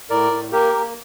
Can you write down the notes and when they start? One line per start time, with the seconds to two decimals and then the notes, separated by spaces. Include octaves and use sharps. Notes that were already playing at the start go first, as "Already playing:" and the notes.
0.10 A2 A#4 D5
0.31 A2
0.52 A#3 G4 A#4
0.73 A#3